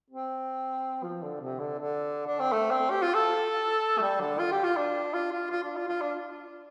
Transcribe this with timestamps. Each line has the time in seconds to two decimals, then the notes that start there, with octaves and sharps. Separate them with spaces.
0.10 C4
1.03 F3
1.23 D3
1.40 C3
1.59 D3
1.79 D3
2.27 D4
2.39 C4
2.52 A3
2.71 C4
2.90 G4
3.02 F4
3.14 A4
3.98 A3
4.01 G3
4.20 D3
4.39 F4
4.52 G4
4.64 F4
4.77 D4
5.13 F4
5.32 F4
5.50 F4
5.63 D4
5.76 F4
5.88 F4
6.01 D4